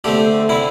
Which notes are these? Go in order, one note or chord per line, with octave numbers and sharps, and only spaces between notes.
D3 A3 C4 G4
D3 C4 E4